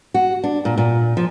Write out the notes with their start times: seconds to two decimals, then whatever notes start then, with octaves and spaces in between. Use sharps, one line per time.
0.14 F#4
0.44 D4
0.65 A#2
0.78 A#2
1.17 F3